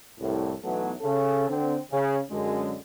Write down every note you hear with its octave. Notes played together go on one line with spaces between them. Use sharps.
C2 A2
B1 B2 E3 F#3 A3 B3
C#3 A4
D3 C4
C#3
F#2 D3 G#3